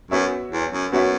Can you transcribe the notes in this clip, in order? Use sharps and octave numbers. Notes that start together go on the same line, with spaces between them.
F#2 B3 F#4 C#5 E5
E2
F#2
F#2 B3 F#4 C#5 E5